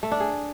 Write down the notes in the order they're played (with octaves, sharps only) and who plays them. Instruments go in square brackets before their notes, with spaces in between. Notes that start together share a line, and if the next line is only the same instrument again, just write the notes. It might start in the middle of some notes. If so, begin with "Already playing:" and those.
[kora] A3
D4
G#4